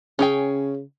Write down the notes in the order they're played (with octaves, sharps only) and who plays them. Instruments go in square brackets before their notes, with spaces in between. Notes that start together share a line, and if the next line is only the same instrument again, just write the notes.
[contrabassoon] C#3 [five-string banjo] C#4 G#4 G5